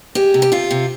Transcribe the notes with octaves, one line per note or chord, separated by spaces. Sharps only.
G#3 G4
C3
G4
C3 F4
C3